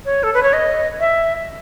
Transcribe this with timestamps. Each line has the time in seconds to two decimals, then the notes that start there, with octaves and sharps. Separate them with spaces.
0.05 C#5
0.23 A4
0.34 B4
0.43 C#5
0.53 D#5
1.00 E5